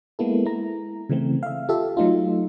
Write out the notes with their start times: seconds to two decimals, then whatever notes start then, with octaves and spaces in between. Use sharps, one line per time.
0.19 G#3 A#3 B3 E4 A4
0.45 E4 A#5
1.09 C#3 E3 A3 C4
1.43 E5 F5
1.69 F4 G4 A4 E5
1.97 F#3 A3 D#4 F4